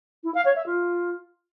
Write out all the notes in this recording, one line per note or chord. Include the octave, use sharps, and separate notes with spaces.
E4
F5
C#5
E5
F4